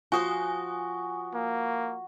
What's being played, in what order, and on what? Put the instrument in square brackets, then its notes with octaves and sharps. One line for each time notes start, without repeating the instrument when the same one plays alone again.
[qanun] F3 C5 C6 [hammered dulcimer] F#4 [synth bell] G#5 D#6
[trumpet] A#3